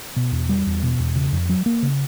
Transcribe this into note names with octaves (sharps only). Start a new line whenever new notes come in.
B2
E2
G3
E2
B2
E2
C#3
F2
F#3
A#3
C#3